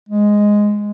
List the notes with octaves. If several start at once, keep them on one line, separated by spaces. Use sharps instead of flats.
G#3